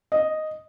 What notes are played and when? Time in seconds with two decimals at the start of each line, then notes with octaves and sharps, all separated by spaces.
0.12 D#5